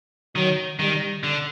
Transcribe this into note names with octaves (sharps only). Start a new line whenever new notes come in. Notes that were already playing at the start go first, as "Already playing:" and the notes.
D#3 F#3
D#3 G3
D3